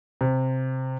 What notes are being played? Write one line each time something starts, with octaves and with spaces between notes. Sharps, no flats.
C3